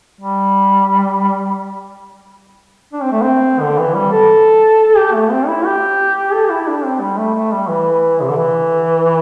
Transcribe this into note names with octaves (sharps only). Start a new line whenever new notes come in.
G3
D4
C4
A3
C4
D3
E3
G3
A4
G4
A3
C4
E4
G4
A4
G4
E4
E4
D4
C4
G3
A3
A3
G3
E3
C3
D3
E3